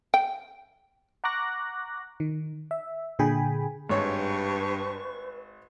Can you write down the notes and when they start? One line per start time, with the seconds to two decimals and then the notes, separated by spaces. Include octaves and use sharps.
0.14 G5
1.24 F#5 A#5 C#6 D6 F#6 A#6
2.20 D#3
2.71 E5
3.19 A#2 D3 G#4 G5 G#5 B5
3.89 G#1 G2 B4 C#5 C#6